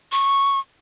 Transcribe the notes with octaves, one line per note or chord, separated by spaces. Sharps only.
C#6